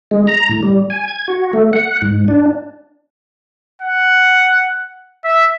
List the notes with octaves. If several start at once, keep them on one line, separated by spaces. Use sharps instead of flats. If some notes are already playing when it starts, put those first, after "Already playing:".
G#3
A#5
A2
G3
G#5
G#6
F#4
A3
F#5
G#2
D4
F#5
E5